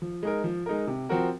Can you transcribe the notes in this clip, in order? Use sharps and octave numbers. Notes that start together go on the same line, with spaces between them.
F3
G#3 D#4 A#4
F3
G#3 D#4 A#4
C3
F3 C4 F#4 A#4